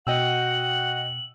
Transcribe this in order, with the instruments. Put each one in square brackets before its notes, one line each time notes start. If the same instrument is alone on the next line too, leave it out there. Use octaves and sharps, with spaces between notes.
[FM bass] B2 [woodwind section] F#4 F#5 [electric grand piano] D#5 G5 E6 [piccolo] F#7